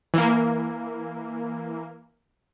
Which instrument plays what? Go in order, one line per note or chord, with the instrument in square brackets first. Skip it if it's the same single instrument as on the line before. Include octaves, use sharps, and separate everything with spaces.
[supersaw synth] E3 A#3